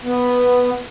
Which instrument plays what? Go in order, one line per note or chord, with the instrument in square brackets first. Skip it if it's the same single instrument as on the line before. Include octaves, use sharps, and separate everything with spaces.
[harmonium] B3